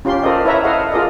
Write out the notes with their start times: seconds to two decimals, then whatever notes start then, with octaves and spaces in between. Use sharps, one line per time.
0.05 C#4 F4 G4 C6
0.24 F4 A4 A#4 C5 D5 D#5
0.45 E4 B4 C#5 E5 A#5
0.64 A4 B4 D#5 F5 F#5
0.92 F4 G#4 A#4 D5 D#5